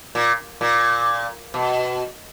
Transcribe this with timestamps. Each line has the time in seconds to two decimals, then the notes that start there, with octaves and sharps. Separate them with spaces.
0.15 A#2
0.61 A#2
1.54 B2